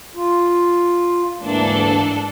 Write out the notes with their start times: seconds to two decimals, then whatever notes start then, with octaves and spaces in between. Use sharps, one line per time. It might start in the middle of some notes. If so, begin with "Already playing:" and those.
0.15 F4
1.41 D2 G#2 E3 A#3 D4 A4